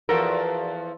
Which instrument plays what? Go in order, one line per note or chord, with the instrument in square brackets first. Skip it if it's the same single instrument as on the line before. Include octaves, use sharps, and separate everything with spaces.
[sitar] E2 F3 A4 [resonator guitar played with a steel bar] F#4 A#4